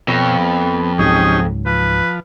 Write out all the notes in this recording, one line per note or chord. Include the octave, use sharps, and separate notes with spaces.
F2 B2 C#5
B3
C#2 G#2 F#3 C#4 D#4 G4 G#4
F3 B4